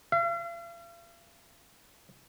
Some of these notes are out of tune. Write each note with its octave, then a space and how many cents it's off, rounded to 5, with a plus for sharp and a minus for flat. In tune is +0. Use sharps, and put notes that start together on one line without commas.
F5 -45